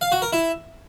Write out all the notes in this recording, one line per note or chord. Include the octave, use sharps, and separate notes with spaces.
F5
F#4
A#4
E4